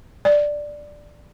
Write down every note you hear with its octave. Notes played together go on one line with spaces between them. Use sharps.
D5